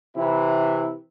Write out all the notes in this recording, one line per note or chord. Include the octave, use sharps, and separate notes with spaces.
C3 E3 E4